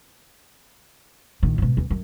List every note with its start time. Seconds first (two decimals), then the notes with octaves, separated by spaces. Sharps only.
1.43 A#1 D#3
1.58 G#2 B2
1.77 E2
1.90 F#2